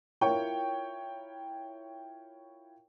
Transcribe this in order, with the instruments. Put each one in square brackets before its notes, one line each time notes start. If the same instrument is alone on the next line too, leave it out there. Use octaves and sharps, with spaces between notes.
[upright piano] E4 F4 A#4 C#5 G5 C#6